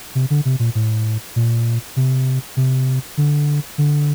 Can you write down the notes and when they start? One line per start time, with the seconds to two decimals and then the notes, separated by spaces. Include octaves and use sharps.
0.15 C3
0.30 D3
0.45 C3
0.59 A#2
0.75 A2
1.36 A#2
1.96 C3
2.57 C3
3.17 D3
3.78 D3